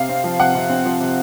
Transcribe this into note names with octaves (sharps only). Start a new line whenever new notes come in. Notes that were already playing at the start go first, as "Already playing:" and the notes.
Already playing: C3 F5
C4
F3
C3 F#5
C3
C4
F3
C3